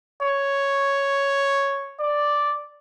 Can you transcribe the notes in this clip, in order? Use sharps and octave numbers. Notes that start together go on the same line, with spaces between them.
C#5
D5